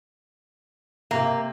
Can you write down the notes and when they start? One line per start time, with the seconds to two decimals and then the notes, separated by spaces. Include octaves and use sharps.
1.11 C3 A#3 E5